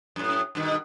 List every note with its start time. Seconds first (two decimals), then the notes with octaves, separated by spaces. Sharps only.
0.16 F#2 A2
0.55 G2 B2 D#3